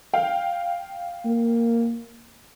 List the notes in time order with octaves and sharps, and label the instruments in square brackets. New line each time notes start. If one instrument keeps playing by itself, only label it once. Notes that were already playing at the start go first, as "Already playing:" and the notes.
[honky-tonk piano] F5 G5
[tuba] A#3